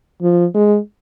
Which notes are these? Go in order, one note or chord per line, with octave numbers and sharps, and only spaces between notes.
F3
G#3